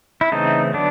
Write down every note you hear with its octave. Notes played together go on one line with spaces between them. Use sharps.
E4
C#3 E3 A3 C4 D#4
D3 F#3 B3 D4